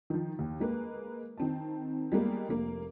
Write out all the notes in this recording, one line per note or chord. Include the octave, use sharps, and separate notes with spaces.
D#3 F3
D#2
G#3 A#3 B4
D#3 C4 A5
G3 G#3 A#3 B3
F1 A#3